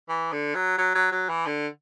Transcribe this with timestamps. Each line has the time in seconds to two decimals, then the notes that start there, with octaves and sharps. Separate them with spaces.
0.09 E3
0.32 D3
0.55 F#3
0.78 F#3
0.95 F#3
1.12 F#3
1.29 E3
1.47 D3